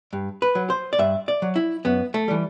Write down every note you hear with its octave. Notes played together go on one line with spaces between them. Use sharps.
G2
B4
F#3
C5
D5
G2 E5
D5
F#3
E4
F#2 B3
A3
E3 G3